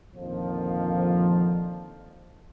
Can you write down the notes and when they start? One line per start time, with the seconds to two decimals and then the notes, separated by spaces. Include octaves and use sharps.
0.16 F2 A#2 D3 D#3 F3